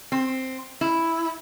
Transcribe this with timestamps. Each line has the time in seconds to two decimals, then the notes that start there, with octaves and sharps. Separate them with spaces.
0.12 C4
0.81 E4